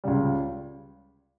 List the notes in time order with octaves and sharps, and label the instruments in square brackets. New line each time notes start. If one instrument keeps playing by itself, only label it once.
[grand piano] C#2 C#3 G3